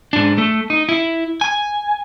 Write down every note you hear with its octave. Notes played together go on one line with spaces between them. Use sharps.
G#2 D4
A3
D#4
E4
G#5